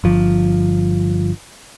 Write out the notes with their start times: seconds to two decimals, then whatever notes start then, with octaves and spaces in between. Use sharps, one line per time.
0.04 G1 F3